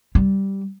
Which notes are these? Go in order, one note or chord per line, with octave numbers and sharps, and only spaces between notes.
G3